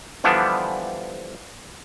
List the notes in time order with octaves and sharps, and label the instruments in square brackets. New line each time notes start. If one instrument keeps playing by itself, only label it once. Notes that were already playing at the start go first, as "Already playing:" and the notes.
[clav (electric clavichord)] D3 E3 F3 G3 B3 D4